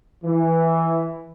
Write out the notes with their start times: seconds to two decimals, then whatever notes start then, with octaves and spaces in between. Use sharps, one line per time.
0.24 E3